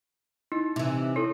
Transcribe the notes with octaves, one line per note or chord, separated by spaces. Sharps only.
D#4 E4
C3 E3
E4 A4 C#5